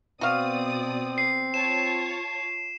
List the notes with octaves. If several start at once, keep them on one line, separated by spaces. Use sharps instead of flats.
B2 C4 F#4 D5 F5 D#6
C7
F4 C#5 A5 E7